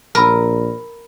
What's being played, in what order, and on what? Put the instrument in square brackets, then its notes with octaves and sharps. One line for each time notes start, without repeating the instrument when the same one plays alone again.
[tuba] A#1 [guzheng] A#4 [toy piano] A5 B5 E6